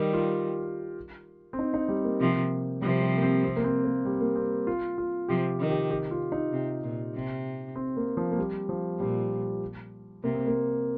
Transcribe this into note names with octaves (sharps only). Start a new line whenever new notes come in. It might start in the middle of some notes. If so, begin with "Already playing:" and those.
Already playing: D#3 G3 G4 A#4
F4
C4
D#4
D#4
G3
A#3
C3 F3
C3 F3 G3
G3
A#3
C4
C4
A#3
C4
A#3
G3
A#3
C4
F4
F4
C3 F3 G4
D#3
G4
G4
F4
D#4
C3
A#2
C3
C4
A#3
F3
A#3
G3
F3
A#2 G3
C3 A#3
C4
A#3